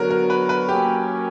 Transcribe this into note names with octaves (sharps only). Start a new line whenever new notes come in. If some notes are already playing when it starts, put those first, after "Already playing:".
Already playing: D3 F#3 B3 F#4 A#4
A#4
B4
B4
F#3 A#3 C#4 G4